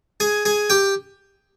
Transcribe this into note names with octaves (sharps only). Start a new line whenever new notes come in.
G#4 G#5
G#4 G#5
G4 G5